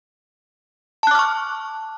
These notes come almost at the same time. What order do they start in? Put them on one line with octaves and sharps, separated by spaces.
A5 F#6 D6 F6 C#6